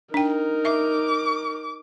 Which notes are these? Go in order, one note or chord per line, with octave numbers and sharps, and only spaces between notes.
D4 D#4 A#4 G5
E5 D6